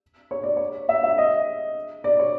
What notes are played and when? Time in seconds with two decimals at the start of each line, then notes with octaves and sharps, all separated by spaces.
0.31 C#5
0.43 D5
0.57 C#5
0.89 E5
1.04 E5
1.18 D#5
2.04 D5
2.19 C#5